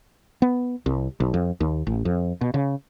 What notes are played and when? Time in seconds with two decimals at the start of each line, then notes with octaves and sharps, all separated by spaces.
0.42 B3
0.86 C2
1.20 B1
1.34 F2
1.60 D#2
1.87 A1
2.05 F2
2.41 B2
2.54 C#3